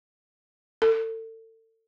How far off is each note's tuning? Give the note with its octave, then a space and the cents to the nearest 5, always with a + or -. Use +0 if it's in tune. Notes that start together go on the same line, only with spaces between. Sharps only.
A4 +35